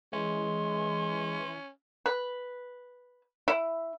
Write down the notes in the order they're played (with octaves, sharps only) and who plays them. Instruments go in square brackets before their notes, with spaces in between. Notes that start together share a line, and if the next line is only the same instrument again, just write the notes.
[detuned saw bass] E3 [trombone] G#3 [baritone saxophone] C#4 [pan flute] C6
[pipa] B4
E4